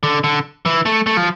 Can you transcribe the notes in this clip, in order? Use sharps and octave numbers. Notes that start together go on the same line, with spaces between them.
D3
D3
E3
A3
A3
F3